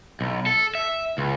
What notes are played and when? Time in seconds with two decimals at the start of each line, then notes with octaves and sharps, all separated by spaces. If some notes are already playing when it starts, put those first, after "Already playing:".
0.21 B1
0.46 A4
0.75 E5
1.18 C#2